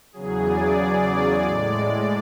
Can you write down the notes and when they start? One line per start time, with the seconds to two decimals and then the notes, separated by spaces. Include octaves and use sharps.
0.13 E2 C#3 F#3 G#4
0.46 D5
0.78 D5
1.44 A2 G#3